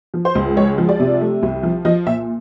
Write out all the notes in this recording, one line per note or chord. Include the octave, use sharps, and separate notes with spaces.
F3
C5
C#2
G#3 C#5
F3
D5
C3
A3
C2
F3
F3 D#5
A#2 E5